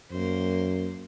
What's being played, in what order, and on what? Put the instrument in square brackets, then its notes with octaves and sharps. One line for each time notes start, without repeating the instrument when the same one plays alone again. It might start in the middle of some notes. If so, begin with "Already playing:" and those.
[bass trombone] F#2 [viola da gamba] A#3 C5